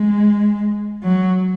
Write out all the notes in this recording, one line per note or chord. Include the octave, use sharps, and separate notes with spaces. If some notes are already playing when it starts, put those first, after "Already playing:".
Already playing: G#3
F#3